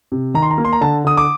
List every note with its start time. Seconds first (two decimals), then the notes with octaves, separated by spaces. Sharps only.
0.12 C3
0.34 D#3 A#5
0.42 C6
0.51 A#5
0.58 A#3
0.65 C6
0.73 A#5
0.81 D3 A5
1.04 D3 D#6
1.17 D6